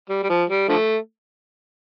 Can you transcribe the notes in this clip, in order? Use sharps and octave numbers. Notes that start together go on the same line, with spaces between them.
G3
G3
F3
G3
D3 F3 A3